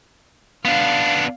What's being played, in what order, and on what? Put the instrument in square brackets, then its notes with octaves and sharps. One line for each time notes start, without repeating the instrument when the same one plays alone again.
[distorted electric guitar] B3 D4 [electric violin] F5